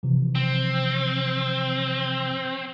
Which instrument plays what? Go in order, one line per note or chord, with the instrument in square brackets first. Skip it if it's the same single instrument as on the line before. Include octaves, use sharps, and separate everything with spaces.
[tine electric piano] C3 E3 F3
[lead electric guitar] C4